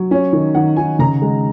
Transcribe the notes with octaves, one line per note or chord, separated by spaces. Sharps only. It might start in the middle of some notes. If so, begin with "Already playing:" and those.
Already playing: F#3
C#4
D#3
D#3 F#5
D#3 G#5
C#3 A#5
G#3